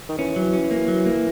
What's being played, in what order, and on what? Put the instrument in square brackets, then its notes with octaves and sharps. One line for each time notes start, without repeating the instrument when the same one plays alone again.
[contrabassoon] D#3
[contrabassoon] E3 [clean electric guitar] C#4
[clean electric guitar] F#3
C#4
A#3
F#3
A#3